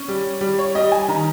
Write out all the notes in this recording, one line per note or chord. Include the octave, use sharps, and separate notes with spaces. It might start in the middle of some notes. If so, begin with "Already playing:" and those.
Already playing: C#4
G3
G3
C#5
G3 D#5
G#5
D#3 A#5